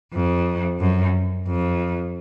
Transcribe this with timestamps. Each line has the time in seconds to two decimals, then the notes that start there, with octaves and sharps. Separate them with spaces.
0.13 F2
0.80 F#2
1.47 F2